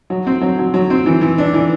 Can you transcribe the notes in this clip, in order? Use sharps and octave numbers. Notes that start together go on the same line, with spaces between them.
F#3
C4
F#3
F#3
F#3
C4
E3
E3
D4
E3